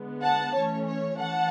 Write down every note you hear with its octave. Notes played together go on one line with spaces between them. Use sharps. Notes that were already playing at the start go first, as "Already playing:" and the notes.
Already playing: D3 G#3 B3
F#5 A5
E3 A3 C#4 C#5
C#5
E3 F#5 A5